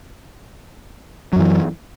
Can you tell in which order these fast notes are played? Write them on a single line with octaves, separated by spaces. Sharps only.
F#3 F#2 E3